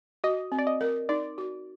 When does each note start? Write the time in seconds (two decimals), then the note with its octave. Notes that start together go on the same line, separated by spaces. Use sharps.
0.24 F#4 D#5
0.52 C4
0.59 D5
0.67 D#5
0.81 A#4
1.09 D#4 D5
1.38 F#4